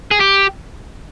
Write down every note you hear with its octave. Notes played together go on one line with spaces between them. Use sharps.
G#4
G4